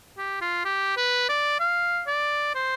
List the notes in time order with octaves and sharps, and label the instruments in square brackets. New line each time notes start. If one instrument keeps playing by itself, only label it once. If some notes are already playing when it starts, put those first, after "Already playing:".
[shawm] G4
F4
G4
B4
D5
F5
D5
C5